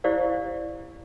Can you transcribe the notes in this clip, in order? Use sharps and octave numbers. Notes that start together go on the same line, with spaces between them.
E4 G4 C5 D5 F5